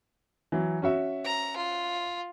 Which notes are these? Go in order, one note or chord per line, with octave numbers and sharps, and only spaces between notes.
E3 F#3
C#4 F#4 E5
A#5
F4